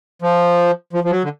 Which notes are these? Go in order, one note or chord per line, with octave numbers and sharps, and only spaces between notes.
F3
F3
F3
F#3
D3